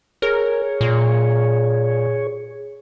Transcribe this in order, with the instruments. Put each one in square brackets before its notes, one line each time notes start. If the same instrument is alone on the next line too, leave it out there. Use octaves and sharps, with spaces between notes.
[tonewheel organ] G#4 C#5 [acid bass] A#4
[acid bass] A#2